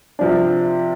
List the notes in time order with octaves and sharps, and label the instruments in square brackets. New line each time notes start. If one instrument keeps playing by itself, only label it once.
[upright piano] C3 F3 D4